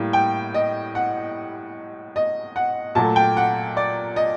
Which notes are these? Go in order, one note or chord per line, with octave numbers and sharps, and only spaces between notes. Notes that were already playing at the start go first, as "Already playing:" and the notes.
Already playing: A2 G3 A#3
G5
D#5
F#5
D#5
F#5
A#2 F#3 A3 A5
G5
F#5
D5
D#5